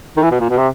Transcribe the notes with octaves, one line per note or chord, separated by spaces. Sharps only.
D#3
E3
B2
A#2
B2
C3